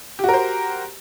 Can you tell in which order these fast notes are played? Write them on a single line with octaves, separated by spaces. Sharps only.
G4 F#4 A#4 C5